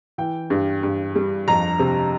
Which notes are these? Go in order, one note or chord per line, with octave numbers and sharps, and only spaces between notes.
E3 G5
G2
G2
G3
F2 A#5
C3